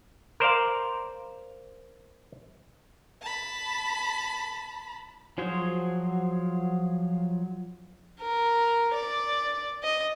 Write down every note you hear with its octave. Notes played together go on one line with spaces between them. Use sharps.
A#4 C5 D5 F5
A5 B5
F3 F#3 G#4 C5 C#5
A#4
D5
D#5